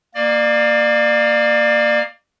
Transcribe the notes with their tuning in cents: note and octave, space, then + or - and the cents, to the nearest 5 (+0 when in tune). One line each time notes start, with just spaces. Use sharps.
A#3 +0 D5 +30